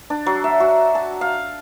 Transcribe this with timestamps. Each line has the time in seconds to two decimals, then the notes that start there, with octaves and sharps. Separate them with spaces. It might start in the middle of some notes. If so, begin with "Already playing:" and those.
0.10 D4
0.26 F#3
0.44 E5
0.60 F#4
0.95 A5
1.21 F5